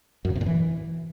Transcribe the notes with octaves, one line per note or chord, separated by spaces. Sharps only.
F#2
C#3
C3
A#2
E3